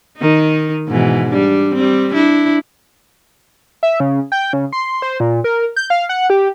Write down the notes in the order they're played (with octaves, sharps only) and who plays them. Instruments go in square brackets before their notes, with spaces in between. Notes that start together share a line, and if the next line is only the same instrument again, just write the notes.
[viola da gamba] D#3 D#4
G#2 B2 E3
G3 D4
G3 C4
D4 E4
[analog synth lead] E5
C#3
G5
C#3
C6
C5
A#2
A#4
G6
F5
F#5
G4